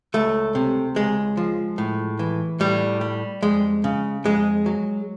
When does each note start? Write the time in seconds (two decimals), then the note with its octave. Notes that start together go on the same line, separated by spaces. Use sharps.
0.14 C#2 A3
0.55 C3
0.96 C#2 G#3
1.37 F3
1.78 A2
2.19 E3
2.60 A2 G3
3.01 G3
3.42 F2 G#3
3.84 C#3
4.25 F2 G#3
4.66 F#3